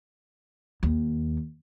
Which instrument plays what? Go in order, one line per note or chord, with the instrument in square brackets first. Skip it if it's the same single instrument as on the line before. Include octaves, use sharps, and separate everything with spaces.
[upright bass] D#2